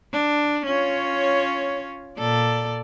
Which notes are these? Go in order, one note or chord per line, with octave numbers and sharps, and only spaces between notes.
D4
C#4 F4 C#5
A#2 A4 D5